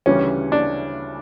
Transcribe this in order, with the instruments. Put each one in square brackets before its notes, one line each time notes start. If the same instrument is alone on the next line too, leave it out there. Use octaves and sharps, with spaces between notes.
[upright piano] D2 C#3 E3 G3 [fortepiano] C#4
[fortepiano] D4